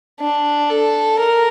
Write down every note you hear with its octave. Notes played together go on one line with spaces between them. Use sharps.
D4
A4
A#4